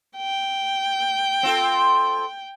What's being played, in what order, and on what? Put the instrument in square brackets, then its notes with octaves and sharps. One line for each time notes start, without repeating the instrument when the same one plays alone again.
[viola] G5
[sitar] C4 F4 A4